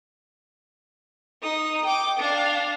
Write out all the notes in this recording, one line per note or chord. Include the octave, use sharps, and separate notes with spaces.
D#4 D#6
G5 D6
D4 F5